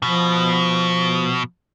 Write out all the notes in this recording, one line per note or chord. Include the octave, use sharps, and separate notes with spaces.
B2 F3